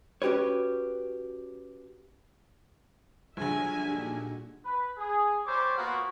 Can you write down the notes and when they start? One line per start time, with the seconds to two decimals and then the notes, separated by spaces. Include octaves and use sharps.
0.22 C#4 F#4 G4 B4 C#5
3.37 A#1 D3 F#3 G3 D4 G#4 E5 G#5
3.85 A#2 D4 D#4 F#4 G4 A4
4.65 B4
4.98 G#4
5.46 G3 C5 C#5 D6
5.78 A#3 B3 F4 F#4